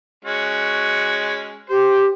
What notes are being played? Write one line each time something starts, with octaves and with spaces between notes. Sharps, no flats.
G#3 C#4 F#4
G4 C5